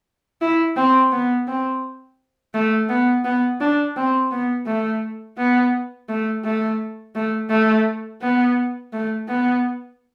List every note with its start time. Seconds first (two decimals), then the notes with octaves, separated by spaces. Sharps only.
0.41 E4
0.76 C4
1.12 B3
1.47 C4
2.54 A3
2.89 B3
3.24 B3
3.61 D4
3.96 C4
4.31 B3
4.66 A3
5.38 B3
6.09 A3
6.44 A3
7.15 A3
7.50 A3
8.21 B3
8.93 A3
9.28 B3